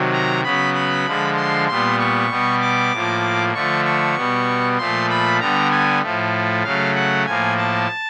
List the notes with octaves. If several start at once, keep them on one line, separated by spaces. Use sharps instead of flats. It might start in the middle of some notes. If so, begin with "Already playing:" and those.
Already playing: C3 D#3 F#3
A#5
C#3 F#3 B3 B5
B5
D3 F3 G#3
C6
A#2 G3 B3 C6
C#6
B2 G3 B3
D6
A2 F3 A#3
D3 F3 A3 C#6
C#6
B2 G3 B3
A#2 F3 A3 C6
B5
D3 G3 B3 A#5
G#5
A2 F3 A3
C#3 F#3 A3 F5
F#5
A2 F3 A#3 G#5
A5